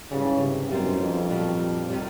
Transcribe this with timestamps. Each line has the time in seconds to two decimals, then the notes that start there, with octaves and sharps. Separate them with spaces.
0.11 G#2 C#3 E3 G3
0.41 C3
0.70 F#2 G3 B3 D#4 G4 C5
1.00 F2
1.30 A#2 G3 B3 D4 F#4
1.89 C3 D#3 G3